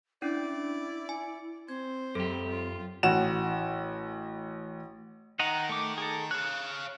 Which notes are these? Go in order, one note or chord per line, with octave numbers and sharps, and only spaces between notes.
C#4 D4 E4 D5
G#5
C4 C5 G#6
F#2 G4 A4
F4
A1 F#4 E7
D#3 D#5 F#5 A#5
A3 D6
G#4 A4
C#5 F5 F#6